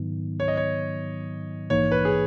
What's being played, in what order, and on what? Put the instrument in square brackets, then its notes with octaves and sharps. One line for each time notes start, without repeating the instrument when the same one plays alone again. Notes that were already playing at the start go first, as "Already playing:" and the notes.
Already playing: [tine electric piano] G#2 D#3 F#3 B3 D#4
[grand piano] C#5
D#5
C#5
[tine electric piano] A#1 G#2 E3 A#3 D#4 [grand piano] C#5
[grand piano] B4
G#4